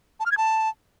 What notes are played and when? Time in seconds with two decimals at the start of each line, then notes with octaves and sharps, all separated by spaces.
0.20 A5
0.26 F6
0.32 G#6
0.38 A5